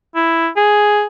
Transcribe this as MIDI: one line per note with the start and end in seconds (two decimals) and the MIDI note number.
0.15 0.48 64
0.56 1.05 68